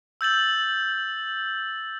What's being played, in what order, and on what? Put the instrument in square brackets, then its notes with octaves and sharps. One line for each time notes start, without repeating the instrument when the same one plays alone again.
[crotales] E6 G6 A6 F#7